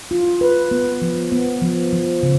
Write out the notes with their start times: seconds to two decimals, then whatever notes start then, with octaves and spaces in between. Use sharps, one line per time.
0.11 F4
0.41 B4
0.71 B3
1.02 F3
1.32 B3
1.62 F3
1.93 F3
2.23 C#3